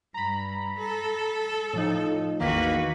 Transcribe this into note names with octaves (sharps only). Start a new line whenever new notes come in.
G2 A#5 B5
A4
A2 F3 D#4
A1 E2 D#3 A#3 F#4 B4